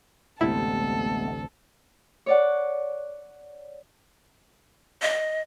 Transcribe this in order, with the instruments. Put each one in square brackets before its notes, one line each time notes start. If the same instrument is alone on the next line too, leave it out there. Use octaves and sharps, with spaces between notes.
[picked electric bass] A1 D2 C3 [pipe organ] G#3 A3 B3 [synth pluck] E4 [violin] A4
[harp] C#5 D5 F#5
[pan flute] D#5